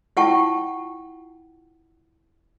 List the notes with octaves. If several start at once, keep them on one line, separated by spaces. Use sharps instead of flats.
E4 F4 F#5 G5 A5 C#6